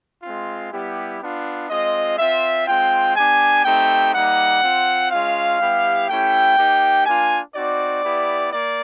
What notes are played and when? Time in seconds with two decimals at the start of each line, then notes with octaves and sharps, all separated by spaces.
0.23 G#3 C4 F4
0.72 G3 B3 E4 G4
1.21 B3 D4 F4
1.70 G#3 C4 F4 D#5
2.18 C4 F4 E5
2.67 G#3 C4 F4 G5
3.16 B3 D4 G4 G#5
3.65 A3 C4 D#4 G4 G5
4.14 G3 A#3 D#4 F#5
4.62 C4 F4
5.11 G#3 C#4 F4 F5
5.59 G3 B3 E4 G4
6.08 A3 C#4 E4 G4 G5
6.57 A#3 D#4 G4
7.06 A#3 D4 F4 G#5
7.55 C4 D#4 F#4 D5
8.04 B3 E4 G4
8.53 A#3 D5